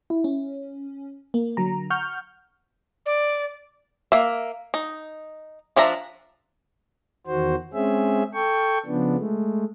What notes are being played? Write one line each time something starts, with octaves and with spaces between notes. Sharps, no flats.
E4
C#4
A#3
D3 F#3 A#5
F#5 C#6 F6 G6
D5
A#3 E5
D#4
F3 D4 E5 A#5
E2 D#3 F#4 C5
G#3 C4 C#4 G#4 E5
A4 G5 C#6
C#3 F3 B3 D4
G#3 A3